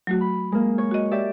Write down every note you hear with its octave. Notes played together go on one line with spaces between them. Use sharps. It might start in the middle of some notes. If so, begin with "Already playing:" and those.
F#3 A3 F#4
B5
G#3 A#3
C#5
F#4 D#5
G4 D5 E5